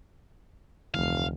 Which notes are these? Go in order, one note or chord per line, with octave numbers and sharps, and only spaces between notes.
F1 D2 E3 F5